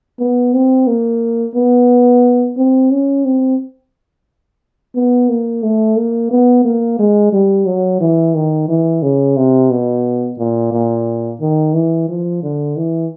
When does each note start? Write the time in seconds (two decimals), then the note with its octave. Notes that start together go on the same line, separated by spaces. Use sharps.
0.20 B3
0.54 C4
0.87 A#3
1.55 B3
2.58 C4
2.91 C#4
3.25 C4
4.95 B3
5.29 A#3
5.63 A3
5.97 A#3
6.31 B3
6.65 A#3
6.99 G#3
7.33 G3
7.67 F#3
8.01 E3
8.35 D#3
8.69 E3
9.03 C#3
9.37 C3
9.71 B2
10.39 A#2
10.73 A#2
11.41 D#3
11.74 E3
12.09 F3
12.43 D3
12.77 E3